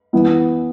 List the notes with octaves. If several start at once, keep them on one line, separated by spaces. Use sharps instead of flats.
E3 B3 E4